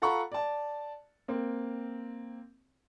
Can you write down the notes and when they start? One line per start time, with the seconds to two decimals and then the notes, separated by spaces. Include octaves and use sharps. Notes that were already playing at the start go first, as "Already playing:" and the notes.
0.02 F4 A4 F#5 A#5 B5 C#6
0.32 D5 A5
1.28 A#3 C4